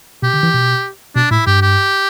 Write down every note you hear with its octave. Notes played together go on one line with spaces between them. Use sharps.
B2 G4
D3
E3
B2
B2 D4
A2 E4
G2 G4
G4